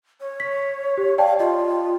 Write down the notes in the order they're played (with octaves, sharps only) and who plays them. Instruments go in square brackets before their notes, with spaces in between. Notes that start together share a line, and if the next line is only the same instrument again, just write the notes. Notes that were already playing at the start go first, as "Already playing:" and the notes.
[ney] C#5
[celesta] B6
G4
[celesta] D5 G5 A5 [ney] F5
[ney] F4 [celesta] D#5